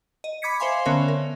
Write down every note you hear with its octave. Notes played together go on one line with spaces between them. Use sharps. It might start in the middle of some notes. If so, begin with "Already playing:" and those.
D#5
B5 D6 G#6 B6 C#7
C5 E5 F5 G#5 C6
D3 B3 C#4 A#4 C#5 E5
A#4